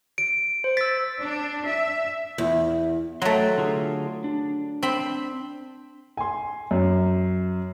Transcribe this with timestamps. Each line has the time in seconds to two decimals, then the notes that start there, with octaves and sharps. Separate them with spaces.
0.18 D7
0.64 C5
0.77 E6 A6 B6
1.19 D4
1.66 E5
2.38 E2
3.22 F#3 A3 G5 A#5 C6
3.58 D3 F4 G#4
4.24 D4
4.83 C4 B5
6.17 G#5 C6
6.71 F#2